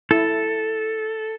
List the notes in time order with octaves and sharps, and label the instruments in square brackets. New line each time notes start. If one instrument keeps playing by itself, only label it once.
[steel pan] E4 [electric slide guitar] A4